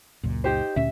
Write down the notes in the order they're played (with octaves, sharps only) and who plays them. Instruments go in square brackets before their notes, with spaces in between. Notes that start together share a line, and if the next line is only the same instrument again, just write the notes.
[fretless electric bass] C#2 F#2 A#2
[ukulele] D#4 G4 C5
[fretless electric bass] D2 A#2 C#4 [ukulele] E5